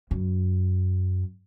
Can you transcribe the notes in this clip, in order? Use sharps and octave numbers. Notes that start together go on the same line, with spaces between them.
F#2